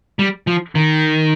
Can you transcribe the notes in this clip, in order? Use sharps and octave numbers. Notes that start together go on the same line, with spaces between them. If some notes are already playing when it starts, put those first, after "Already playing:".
G3
F3
D#3